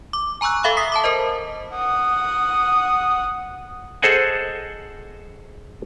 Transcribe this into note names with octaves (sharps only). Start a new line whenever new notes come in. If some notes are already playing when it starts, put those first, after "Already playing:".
D6
G#5 A#5 C#6 E6 F#6
A4 E5 F5 B5 C#6 E6
D#6 B6 C7
A5 B5 D6
A#4 C5 D#5
F#5 D#6
G#4 A4 C5 D#5 F#5 G#5